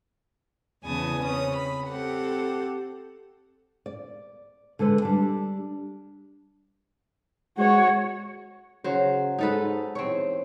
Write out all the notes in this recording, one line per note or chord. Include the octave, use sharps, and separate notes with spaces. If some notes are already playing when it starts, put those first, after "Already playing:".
E2 C#3 B3 G#5 A5 D#6
C#3 C4 C#4 B4 D#6
B5
C4 G4 A4 F#5
D5
D3 G#3 A4 B4
G3 D4
G#3 F#4 C#5
C#3 F#3 C5
G#2 D#4 A4 B4
E2 C4 C#5